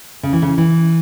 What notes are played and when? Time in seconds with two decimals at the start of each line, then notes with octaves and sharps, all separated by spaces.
0.23 C#3
0.33 E3
0.42 C#3
0.58 E3